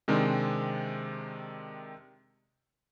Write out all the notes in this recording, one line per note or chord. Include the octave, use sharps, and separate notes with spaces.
C3 D#3 G#3 C4 D4